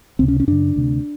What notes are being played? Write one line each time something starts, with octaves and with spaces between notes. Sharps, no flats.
C#2 C3 C4
C#4
C#4
F#2 C#3 D4
D2 C3